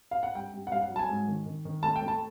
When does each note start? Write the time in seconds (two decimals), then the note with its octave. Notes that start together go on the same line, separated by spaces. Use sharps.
0.11 F5
0.23 F#5
0.35 G2 G5
0.54 G2
0.67 F#5
0.72 G2 F5
0.81 F#5
0.90 F#3
0.96 A5
0.99 G#5
1.09 G#2
1.28 D#3
1.46 D#3
1.65 D#3
1.83 A3 A5
1.96 G5
2.02 A3
2.08 A5